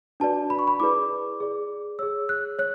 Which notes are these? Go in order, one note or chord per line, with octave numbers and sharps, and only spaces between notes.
D4 F#4 B4 D5 A5
B5
C#6
B5
E4 G#4 B4 D5 D6
G#4 D5
G#4 C#5 E6
F#6
C#5 F#6